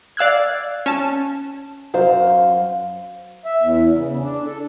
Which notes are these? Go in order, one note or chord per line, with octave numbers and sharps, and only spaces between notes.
D5 F5 E6 F#6 G#6
C#4 A5
F#2 C5 F5
E5
E2
C#3
D4
A4